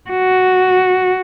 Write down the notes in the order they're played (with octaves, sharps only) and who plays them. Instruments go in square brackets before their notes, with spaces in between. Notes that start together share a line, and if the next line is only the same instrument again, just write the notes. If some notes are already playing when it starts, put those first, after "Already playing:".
[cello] F#4